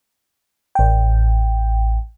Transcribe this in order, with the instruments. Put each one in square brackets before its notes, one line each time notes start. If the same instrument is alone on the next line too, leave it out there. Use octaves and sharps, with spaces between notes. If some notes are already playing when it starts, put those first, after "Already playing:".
[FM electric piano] A1 G5